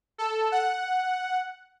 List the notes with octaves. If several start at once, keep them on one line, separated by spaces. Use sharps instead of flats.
A4
F#5